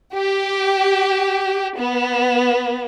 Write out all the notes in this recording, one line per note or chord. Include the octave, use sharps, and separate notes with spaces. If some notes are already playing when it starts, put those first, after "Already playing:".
G4
B3